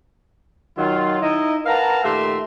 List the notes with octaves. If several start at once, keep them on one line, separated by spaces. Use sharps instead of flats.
D#3 F#3 F4
D#4 E4 D#5
A#4 B4 F5 F#5 A5 A#5
A#2 D#3 A3 G4 E5 C6